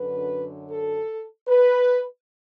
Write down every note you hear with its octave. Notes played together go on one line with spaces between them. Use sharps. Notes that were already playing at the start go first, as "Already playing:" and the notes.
Already playing: F#2 D3 B4
A4
B4